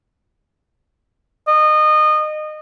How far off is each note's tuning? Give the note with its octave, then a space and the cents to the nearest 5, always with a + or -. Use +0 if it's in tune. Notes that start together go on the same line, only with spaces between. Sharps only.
D#5 -25